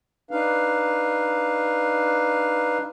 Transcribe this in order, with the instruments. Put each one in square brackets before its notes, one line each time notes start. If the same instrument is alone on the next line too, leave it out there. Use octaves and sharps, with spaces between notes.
[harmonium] D4 D#4 B4 F5